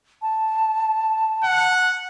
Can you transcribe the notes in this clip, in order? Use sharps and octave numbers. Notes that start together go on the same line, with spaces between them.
A5
F#5